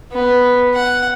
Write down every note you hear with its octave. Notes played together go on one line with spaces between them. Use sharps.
B3
F#5